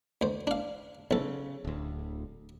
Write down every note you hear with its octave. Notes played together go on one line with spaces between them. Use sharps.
D2 C5
D4 F5
B1 C#3 A4
D1 D2